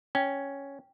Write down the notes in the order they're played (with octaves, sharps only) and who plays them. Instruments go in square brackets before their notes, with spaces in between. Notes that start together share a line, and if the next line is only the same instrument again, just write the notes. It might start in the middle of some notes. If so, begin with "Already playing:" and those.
[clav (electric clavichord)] C#4 [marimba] G5